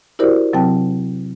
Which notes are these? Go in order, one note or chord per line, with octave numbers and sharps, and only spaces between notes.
E4 F#4 G4 A#4 C5 D5
C3 F#3 C4 G5 A5